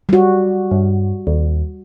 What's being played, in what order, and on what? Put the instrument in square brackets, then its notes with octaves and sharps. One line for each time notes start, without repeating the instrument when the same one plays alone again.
[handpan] G3 F#4
[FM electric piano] G2
D#2